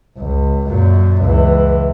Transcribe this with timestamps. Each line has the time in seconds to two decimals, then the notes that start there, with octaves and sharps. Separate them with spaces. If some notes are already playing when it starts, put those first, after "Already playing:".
0.17 C#2
0.67 F#2 A#2
1.22 C#2 E3